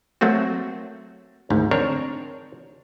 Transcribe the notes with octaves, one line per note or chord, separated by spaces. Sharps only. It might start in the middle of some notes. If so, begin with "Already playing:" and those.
F#3 A3 A#3 C4 F#4
G#1 D2 G#2
C4 D4 A#4 C#5